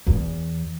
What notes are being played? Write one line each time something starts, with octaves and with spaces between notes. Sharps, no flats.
E2